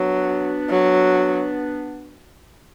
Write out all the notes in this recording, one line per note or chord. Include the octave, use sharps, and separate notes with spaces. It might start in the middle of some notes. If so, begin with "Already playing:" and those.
Already playing: F#3 B3 D4
F#3